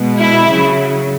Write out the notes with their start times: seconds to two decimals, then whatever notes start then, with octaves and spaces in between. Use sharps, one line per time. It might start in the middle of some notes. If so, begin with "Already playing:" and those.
Already playing: B2 G#3
0.19 E4
0.48 C#3 F#3